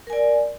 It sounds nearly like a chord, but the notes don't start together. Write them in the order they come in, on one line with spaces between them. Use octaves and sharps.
A#4 G#5 D5